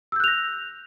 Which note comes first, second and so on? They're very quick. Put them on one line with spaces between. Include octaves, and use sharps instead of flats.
E6 G6 F#6 F7 A#6